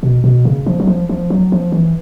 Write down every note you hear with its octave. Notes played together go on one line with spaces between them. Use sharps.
B2
B2
C#3
F3
F#3
F3
F3
F#3
F3
E3